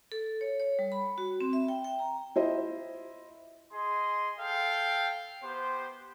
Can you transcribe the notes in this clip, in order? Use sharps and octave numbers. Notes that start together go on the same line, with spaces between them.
A4
C#5
C#5
G3
B5
F#4
C4
E5
G5
G5
A#5
E4 F4 C5 D#5 E5
G#4 D#5 C6
A4 F5 G5
B3 G4 C5